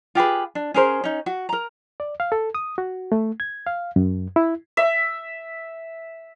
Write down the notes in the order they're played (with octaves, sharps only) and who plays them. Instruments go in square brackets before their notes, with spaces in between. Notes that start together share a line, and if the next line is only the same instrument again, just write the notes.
[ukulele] F4 G4 G#4 B4
D4
C#4 G#4 A#4 C5
C#4 D#4
F#4
A#4 A#5
[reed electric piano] D5
F5
A4
D#6
F#4
A3
G#6
F5
F#2
E4
[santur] E5